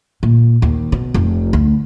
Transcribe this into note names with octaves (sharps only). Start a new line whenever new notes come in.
A#2
D#2
B2
F1
D2